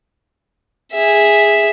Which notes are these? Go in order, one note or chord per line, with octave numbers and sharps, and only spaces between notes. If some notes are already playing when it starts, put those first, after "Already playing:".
G#4 E5